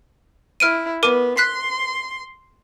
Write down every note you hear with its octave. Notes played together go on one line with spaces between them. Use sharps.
E4 F6 D7 D#7
B3 A#4 D6 D#7
C6 F#6 B6 C7